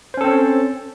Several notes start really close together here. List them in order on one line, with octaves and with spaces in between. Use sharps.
C5 C#4 A4 C4 C#5